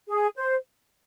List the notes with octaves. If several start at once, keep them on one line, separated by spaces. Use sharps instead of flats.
G#4
C5